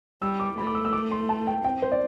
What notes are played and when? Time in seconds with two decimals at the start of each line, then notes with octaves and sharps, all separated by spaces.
0.21 G3 E6
0.40 D6
0.57 A3 B5
0.67 D6
0.75 E6
0.85 E6
0.93 D6
1.11 C6
1.29 A5
1.47 G5
1.64 C4 G5
1.82 C5
1.92 D5